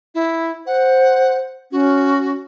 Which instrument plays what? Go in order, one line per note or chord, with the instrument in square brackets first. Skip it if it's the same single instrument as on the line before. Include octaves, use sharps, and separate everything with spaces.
[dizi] E4
[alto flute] C5 [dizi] F#5
[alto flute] C#4 [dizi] F#4